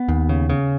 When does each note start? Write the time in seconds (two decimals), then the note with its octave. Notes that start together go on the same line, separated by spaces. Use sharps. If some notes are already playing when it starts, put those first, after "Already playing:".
Already playing: B3
0.08 D#2
0.29 C#3
0.50 C#3